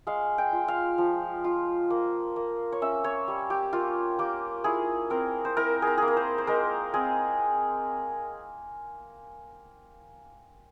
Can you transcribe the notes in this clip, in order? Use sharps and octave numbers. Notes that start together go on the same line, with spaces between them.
G#3 F5
G5
F4
F5
F3
F4
A#3
A#3
C#5
C#4 E5
C#5
G3
G4
A#3 F4
A#3 G4
E4 G#4
C4 A#4
C5
E4 A#4
G#4 A#4
A#3 G#4
A#4
C5
C5
G#3 A#4
C4 G#4